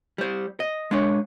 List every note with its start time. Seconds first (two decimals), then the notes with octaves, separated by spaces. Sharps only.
0.18 G3 C5
0.60 D#5
0.91 G#3 D4 C#5